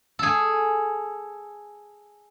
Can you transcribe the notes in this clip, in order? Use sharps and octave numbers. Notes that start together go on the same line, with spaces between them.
G#4 A4